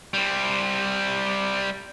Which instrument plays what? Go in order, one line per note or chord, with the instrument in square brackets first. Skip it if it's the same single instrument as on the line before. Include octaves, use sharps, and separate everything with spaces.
[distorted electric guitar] G3 C4